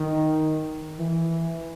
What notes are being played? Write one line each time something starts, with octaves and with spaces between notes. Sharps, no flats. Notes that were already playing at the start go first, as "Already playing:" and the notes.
Already playing: D#3
E3